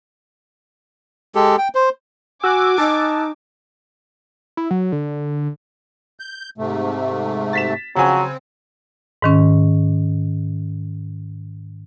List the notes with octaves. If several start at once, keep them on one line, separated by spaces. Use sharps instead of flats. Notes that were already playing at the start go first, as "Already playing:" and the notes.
G#3 G4 A4
G5
C5
F#4 G#5 D6 E6 F#6
D#4 A5
E4
F#3
D3
G6
G#2 C3 A3
A6 B6 E7
C#3 F3 F#3 C4 G#5
G#2 D#3 C#4